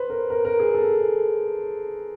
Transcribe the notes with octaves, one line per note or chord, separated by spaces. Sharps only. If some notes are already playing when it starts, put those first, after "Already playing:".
Already playing: B4 C5
A#4
A#4
A#4
G#4
A4